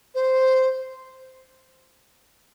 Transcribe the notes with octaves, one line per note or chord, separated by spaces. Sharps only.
C5